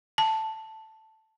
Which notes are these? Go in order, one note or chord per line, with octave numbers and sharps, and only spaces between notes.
A5